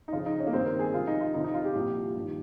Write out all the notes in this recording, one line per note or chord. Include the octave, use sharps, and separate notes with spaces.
D#4
F2 C#3 F3 F4
D#4
C#4
A#3
G2 D#3 C4
A#4
G#4
C#2 C3 F3 F4
D#4
F4
F2 C3 F3 D#4
D#4
F4
G4
C2 A#2 F3
G2 D#3